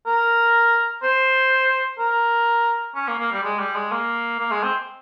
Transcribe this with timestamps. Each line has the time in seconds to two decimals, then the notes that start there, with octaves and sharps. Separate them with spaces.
0.06 A#4
1.03 C5
1.99 A#4
2.95 C#4
3.07 A#3
3.19 A#3
3.32 G3
3.43 G#3
3.59 G3
3.75 G#3
3.91 A#3
4.39 A#3
4.51 G#3
4.63 C4